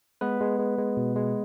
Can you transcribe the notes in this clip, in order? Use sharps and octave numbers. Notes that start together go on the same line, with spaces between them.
G#3 B3 B4
G#3
G#3
G#3
B2
G#3